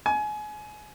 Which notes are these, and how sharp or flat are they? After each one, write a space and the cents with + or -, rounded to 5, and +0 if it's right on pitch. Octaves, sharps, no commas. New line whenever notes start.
G#5 +25